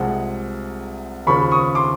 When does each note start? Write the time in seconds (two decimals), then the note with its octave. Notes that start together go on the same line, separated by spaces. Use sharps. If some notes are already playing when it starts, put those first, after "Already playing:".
Already playing: C2 C3 F3 G#3 F#5
1.27 D#2 C#3 F3 B5 C#6
1.52 C#6 D#6
1.75 C6 D6